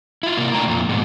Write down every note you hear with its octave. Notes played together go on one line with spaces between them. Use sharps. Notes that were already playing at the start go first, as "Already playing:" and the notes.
E4 F4
C3 A#3
A2 A3 D4 G5 A#5
F2 A#2
G#2 B2